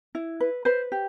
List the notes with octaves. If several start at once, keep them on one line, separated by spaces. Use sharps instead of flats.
E4
B4
B4 C5
G4